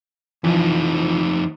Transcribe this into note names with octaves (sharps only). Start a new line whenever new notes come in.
F2 E3 F3 D#4